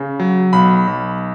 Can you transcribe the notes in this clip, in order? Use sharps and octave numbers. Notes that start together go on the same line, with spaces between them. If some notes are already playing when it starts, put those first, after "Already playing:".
Already playing: C#3
F#3
B1 B5
B1